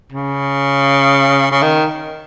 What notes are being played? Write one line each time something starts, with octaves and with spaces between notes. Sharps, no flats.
C#3
C#3
D#3